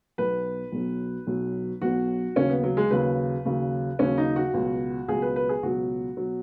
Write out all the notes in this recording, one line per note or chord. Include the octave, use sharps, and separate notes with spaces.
B1 B2 F#3 B4
B1 B2 F#3
B1 B2 F#3
B1 B2 F#3 F#4
D#2 C#3 F#3 C#4
B3
F#3
G#3
D#2 C#3 F#3 B4
D#2 C#3 F#3
D#2 C#3 F#3 C#4
D#4
F#4
C#2 B2 F#3
C#2 B2 F#3 G#4
B4
B4
G#4
C#2 B2 F#3 F#4
B2 F#3